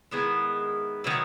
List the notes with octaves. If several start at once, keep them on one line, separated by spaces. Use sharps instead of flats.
D#3 G#3 B3 E4
D#3 F#3 B3 E4